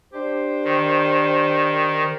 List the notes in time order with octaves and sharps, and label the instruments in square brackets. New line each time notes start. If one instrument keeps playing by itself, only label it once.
[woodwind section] D4 G4 C5
[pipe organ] D#3